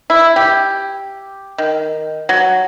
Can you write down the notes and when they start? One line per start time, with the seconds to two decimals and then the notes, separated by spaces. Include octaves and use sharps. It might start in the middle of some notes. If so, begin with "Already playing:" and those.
0.10 E4
0.36 G4
1.58 D#3
2.29 F#3